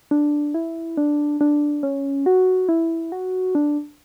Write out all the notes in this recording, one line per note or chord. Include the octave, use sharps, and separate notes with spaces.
D4
E4
D4
D4
C#4
F#4
E4
F#4
D4